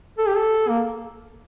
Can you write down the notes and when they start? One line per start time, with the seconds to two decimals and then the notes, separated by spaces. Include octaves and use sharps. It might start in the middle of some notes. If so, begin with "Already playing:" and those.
0.18 A4
0.27 G4
0.36 A4
0.68 A#3